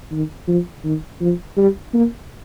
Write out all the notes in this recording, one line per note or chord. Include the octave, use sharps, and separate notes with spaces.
D#3
F3
D#3
F3
G3
A#3